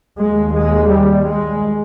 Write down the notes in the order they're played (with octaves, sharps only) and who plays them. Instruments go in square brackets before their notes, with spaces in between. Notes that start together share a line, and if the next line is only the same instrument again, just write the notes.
[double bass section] D#2 G#3
G#3
G3
G#3